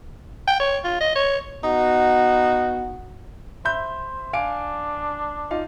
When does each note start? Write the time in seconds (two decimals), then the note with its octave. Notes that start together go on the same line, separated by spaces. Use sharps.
0.48 G5
0.60 C#5
0.84 F4
1.01 D#5
1.16 C#5
1.64 B3 D#4 F#4
3.65 C5 E5 B5 G6
4.33 D4 F5 G#5 D7
5.51 D#4 F4 F5